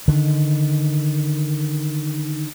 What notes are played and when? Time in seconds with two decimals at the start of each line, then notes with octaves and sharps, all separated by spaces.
0.08 D3 D#3